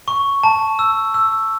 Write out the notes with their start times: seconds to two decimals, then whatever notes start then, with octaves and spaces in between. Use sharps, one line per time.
0.08 C#6
0.43 A5
0.79 E6
1.14 E6